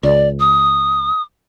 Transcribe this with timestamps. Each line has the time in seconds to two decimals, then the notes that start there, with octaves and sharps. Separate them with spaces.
0.03 C#2 D5
0.40 D#6